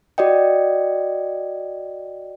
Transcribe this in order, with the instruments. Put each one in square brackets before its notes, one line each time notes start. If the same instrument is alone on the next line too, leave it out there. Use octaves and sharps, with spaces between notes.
[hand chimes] F#4 D5 D#5 G5